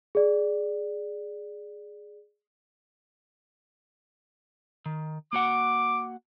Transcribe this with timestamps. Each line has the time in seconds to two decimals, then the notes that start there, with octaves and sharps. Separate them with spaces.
0.15 G#4 D5
4.86 D#3
5.33 A#3 F#4 F#5 D6